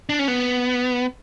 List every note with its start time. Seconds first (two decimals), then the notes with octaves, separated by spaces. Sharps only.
0.09 D4
0.19 C#4
0.28 B3